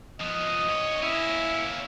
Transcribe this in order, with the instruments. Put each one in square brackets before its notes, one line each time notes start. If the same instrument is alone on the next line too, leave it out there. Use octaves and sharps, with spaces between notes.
[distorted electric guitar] F3 B3 [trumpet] D#5
[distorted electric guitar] G2 C#5
[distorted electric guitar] A#3 C#4 [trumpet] E4